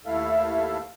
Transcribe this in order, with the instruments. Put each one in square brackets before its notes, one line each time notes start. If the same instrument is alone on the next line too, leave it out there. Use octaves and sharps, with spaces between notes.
[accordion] D#2 A3 E4 A4 E5 F5